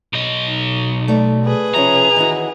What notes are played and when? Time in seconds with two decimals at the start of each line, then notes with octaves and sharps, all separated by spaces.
0.13 B1 D#5
0.48 D#4
1.08 A3 D5
1.45 G#4 B4
1.74 C3 F3 C#4 A#5
2.16 D#3 E3 F#4